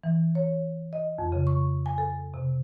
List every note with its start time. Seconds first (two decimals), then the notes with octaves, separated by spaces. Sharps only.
0.04 E3
0.35 C#5
0.93 D#5
1.18 F2
1.32 C#3
1.47 C#6
1.86 G#5
1.98 A4
2.34 C3